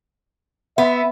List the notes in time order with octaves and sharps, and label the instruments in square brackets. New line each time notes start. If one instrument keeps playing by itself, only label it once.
[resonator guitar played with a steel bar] B3 [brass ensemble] E5